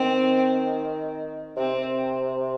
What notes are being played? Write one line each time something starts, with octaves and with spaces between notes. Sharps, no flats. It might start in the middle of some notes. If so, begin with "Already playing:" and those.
Already playing: D#3 C4
C3 C4